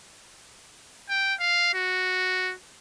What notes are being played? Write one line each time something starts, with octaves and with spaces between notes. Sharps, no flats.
G5
F5
F#4